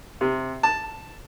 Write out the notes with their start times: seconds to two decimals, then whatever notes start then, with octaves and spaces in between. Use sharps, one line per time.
0.21 C3
0.63 A5